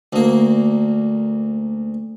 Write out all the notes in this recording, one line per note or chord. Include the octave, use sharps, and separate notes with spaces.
D2 A#3